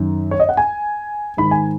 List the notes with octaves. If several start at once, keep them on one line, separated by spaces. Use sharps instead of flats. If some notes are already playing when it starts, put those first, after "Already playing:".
Already playing: F#2 D#3
C#5
D#5
F#5
G#5
G#2 D#3 B5
G#5